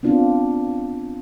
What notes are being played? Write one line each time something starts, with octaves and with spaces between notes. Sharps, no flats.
B3 C4 D4 F4